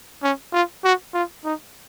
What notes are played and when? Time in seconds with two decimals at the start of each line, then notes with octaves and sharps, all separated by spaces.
0.23 C#4
0.53 F4
0.84 F#4
1.14 F4
1.44 D#4